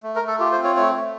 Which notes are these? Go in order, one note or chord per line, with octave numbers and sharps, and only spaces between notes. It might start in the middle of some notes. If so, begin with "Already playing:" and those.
A3
A#4
A3
A4
F4 G4
C5
C4
C#5
A3 C#5
A3